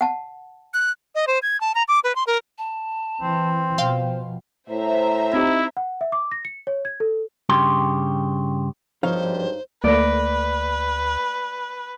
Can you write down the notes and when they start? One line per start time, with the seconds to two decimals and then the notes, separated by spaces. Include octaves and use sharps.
0.01 F#5 A5
0.74 F#6
1.15 D#5
1.27 C5
1.42 G#6
1.61 A5
1.75 A#5
1.88 D6
2.04 B4
2.15 C6
2.27 A#4
2.58 A5
3.21 E3 C4
3.78 B2 F3 C5 F5 G5 C6
4.70 A2 C5 E5 A#5
5.33 C4 D#4 E4 G4
5.77 F#5
6.01 E5
6.12 D6
6.31 A#6
6.45 C#7
6.67 C#5
6.85 G#6
7.00 A4
7.49 G2 C#3 G4 C6
9.03 G#1 G2 F3 D#4 C5 C#5 F5
9.84 D2 A3 A#3 B4 D5 A#6